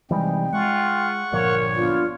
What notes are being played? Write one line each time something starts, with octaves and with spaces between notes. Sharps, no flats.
C3 E3 G3 G#3 D#4 G5
G#3 F4 F#5 C#6
G1 A#2 F3 A#4 C#5
B3 D4 F4